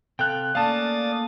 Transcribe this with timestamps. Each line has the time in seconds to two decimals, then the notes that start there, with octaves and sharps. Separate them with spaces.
0.19 C3 A4 F5 G5 F#6
0.55 A3 A#3 C#4 D5 F5 A5 D#6 A6